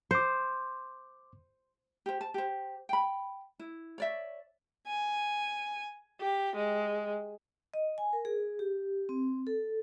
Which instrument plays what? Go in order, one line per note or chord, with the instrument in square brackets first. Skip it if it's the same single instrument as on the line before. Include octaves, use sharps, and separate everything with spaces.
[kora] C5 [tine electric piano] C6 D6
[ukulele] G4 C5
A5
G4 C5
G5 B5
E4
C#5 D5 E5
[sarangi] G#5
G4
G#3
[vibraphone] D#5
G#5
A#4
G#4
G4
C4
A4